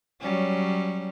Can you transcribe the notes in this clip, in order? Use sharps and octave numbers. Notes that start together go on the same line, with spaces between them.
F#3 G3 C#4